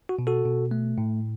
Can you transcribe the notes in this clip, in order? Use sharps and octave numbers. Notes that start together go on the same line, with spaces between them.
F#4
B2
F#4 A4
B2
A3
A2